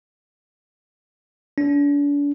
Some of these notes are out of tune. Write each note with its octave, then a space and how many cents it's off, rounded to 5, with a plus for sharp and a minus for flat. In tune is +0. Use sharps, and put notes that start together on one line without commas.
D4 -40